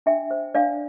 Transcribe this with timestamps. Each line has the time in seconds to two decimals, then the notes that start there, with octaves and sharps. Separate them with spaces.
0.06 D4 E5 G5
0.31 C5
0.55 D4 D5 F5